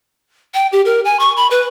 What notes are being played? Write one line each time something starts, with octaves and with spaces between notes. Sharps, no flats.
G5
G4
A#4
G#5
C#6
B5
B4